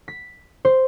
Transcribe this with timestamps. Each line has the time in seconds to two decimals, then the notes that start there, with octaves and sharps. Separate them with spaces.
0.08 B6
0.65 C5